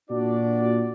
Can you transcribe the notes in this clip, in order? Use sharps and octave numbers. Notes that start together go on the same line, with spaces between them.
A#2 D4 F#4 D5